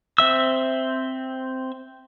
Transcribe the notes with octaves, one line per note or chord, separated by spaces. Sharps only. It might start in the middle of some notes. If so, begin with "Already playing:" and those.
C4 E5 E6